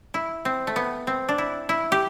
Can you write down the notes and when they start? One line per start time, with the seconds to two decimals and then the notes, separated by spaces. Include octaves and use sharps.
0.14 E4
0.45 C4
0.67 A3
0.76 B3
1.07 C4
1.29 D4
1.38 E4
1.69 E4
1.92 G4